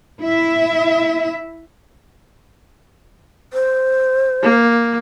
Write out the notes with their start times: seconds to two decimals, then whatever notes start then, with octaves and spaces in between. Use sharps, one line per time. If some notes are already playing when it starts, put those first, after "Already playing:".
0.22 E4 E5
3.53 C5
4.42 A#3